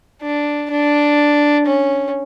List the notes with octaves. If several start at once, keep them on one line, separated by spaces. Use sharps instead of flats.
D4
D4
C#4